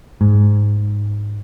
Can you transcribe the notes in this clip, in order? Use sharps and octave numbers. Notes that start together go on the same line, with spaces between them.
G#2